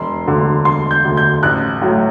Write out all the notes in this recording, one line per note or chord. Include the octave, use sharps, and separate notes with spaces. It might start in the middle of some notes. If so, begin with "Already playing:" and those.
Already playing: E1 C6
D2 D3
E1 C6
G6
D2 D3
G6
A1 F#6
A2 F#3